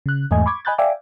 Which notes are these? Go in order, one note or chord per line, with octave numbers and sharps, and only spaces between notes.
C#3 F#6
E2 G#2 A3 D#5 G#5
B5 C#6 D6 G#6
D#5 G#5 B5 F#6 G6 A6
D5 E5 F5 G5 G#5 D6